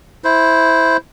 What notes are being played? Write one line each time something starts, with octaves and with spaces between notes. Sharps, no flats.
E4 C5